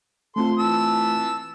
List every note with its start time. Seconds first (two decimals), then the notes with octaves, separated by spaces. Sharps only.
0.36 A3 C4 F4 A4 C6
0.59 E3 A5 E6